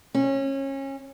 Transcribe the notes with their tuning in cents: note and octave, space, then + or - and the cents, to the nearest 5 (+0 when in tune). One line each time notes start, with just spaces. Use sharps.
C#4 -25